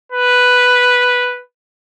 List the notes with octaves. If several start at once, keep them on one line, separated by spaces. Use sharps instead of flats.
B4